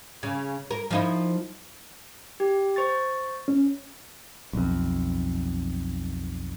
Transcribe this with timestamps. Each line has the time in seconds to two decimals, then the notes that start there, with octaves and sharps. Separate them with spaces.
0.23 C#3
0.71 A#4
0.91 F3 D#4 E4
2.40 G4
2.76 C5 C#6 A6
3.48 C#4
4.53 B1 F2